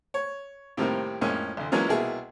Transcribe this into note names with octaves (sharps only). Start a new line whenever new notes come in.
C#5
A2 C3 D#3 G3 A#3 C4
F2 A2 G#3 A#3 C#4
A1 D2
E3 F#3 G#3 A#3 C#4 F4
C2 B2 A#3 E4 G#4